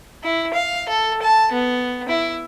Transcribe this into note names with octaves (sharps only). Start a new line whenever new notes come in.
E4
F5
A4
A5
B3
E4